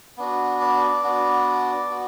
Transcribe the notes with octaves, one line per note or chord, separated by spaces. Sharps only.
B3 D4 F#4
D5
B3 D4 F#4
B3 F#4